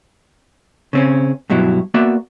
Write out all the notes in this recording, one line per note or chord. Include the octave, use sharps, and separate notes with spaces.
C#3 C4 C#4
G2 B2 F#3 E4
A#3 B3 F#4 D5 E5